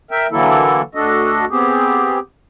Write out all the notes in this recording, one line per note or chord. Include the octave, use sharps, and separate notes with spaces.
A#4 E5 G5
D3 E3 F#3 A#3 E4 A4
D2 D4 F#4 A4 D#5
B3 C4 G4 G#4